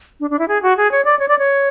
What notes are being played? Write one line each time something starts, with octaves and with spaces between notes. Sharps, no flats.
D4
D4
E4
G#4
F#4
G#4
C#5
D5
C#5
D5
C#5